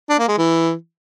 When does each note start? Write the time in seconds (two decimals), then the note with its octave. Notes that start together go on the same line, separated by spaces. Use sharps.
0.09 D4
0.19 A#3
0.28 G#3
0.37 E3